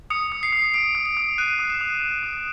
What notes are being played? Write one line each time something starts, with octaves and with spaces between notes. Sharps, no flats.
D#6 C#7
D#6
C7
D#6
D#6 D7
D#6
D7
D#6
F#6 D#7
D#6
E7
D#6
D#6
D#6